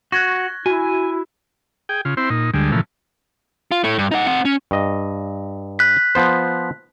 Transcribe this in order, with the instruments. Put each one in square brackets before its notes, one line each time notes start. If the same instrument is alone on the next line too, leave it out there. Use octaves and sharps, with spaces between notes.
[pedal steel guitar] F#4 [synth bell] C#6 [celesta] F#6 G#6 A#6
[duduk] E4 [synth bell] F#4 [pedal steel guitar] G#5
[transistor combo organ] G#4 G5
C#3 F4
C4 E4 C5
A#2 D#4
D2 D3 G3 G#3
A#2 C#3 E3 F3 A3
[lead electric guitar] F4
A2 A3
G2
D#4 F#5
C4 F#5
C#4
[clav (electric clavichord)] G2 D#5
[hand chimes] F#6 B6
[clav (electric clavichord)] F3 B3 C5